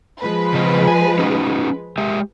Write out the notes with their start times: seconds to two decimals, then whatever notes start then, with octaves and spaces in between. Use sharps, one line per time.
0.21 F3 G#3 B4
0.54 C#3 C4 D#5
0.87 G#5
1.19 C#4 D#4 F#4
1.98 G#3 G4 E5